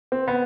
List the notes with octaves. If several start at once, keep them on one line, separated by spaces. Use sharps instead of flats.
C4
B3